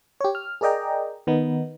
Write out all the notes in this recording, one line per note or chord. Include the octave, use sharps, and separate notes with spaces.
G4 C#5
F6
G#4 A#4 D5 D#5 G5 A#5
D#3 B3 D#4